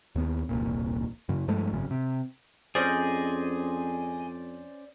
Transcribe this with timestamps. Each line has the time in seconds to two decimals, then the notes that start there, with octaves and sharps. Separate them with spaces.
0.15 D#2 B3
0.49 E1 C2 A#2
1.29 F#2 C#3
1.48 G2 F3 G#3 A3
1.71 G#1 F#2 C#3
1.91 C3
2.75 F2 C#4 G#4 C5 D5 D#5